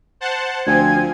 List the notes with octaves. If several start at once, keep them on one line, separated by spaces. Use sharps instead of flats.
C5 F#5 A5
D2 F3 C4 G#5 G#6